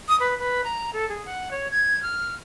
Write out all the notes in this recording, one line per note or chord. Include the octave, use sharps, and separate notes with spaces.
D#6
B4
B4
A#5
A4
G#4
F#5
C#5
G#6
F6